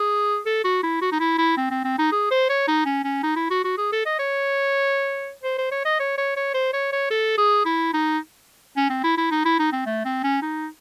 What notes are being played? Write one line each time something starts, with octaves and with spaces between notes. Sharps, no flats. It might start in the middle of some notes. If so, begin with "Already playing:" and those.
Already playing: G#4
A4
F#4
E4
F#4
D#4
E4
E4
C4
C4
C4
D#4
G#4
C5
C#5
D#4
C#4
C#4
D#4
E4
F#4
F#4
G#4
A4
D#5
C#5
C5
C5
C#5
D#5
C#5
C#5
C#5
C5
C#5
C#5
A4
G#4
E4
D#4
C#4
C4
E4
E4
D#4
E4
D#4
C4
A3
C4
C#4
D#4